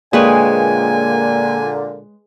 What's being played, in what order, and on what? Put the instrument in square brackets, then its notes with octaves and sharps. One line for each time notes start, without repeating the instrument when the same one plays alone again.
[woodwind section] A#2 D3 [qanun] G#3 B4 C#5 [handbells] A#3 G5 [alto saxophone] G#5